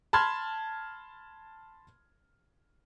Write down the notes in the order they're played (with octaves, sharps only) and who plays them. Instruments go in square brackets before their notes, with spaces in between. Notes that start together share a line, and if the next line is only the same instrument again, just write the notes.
[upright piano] A5 B5 C6 F6 G#6